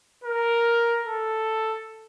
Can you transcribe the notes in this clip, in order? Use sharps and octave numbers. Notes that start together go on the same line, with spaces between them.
A#4
A4